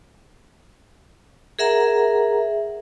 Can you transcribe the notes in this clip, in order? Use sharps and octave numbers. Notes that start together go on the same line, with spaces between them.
G#4 A#4 E5 F#5 A#5